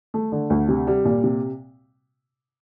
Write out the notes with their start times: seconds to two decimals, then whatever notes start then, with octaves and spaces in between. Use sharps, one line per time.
0.14 A3
0.32 D3
0.50 D2
0.69 C3
0.87 G3
1.05 A#2
1.24 C3